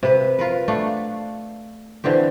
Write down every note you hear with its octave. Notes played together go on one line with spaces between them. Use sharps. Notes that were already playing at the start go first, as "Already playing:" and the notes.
C3 B4
F4 A#4 B4
A3 D4 F5 F#5
D3 E3 C4 G4